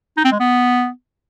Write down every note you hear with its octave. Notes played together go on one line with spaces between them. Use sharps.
D#4
C4
G#3
B3